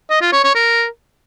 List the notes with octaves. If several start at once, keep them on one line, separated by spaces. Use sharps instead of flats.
D#5
F4
C#5
C#5
A#4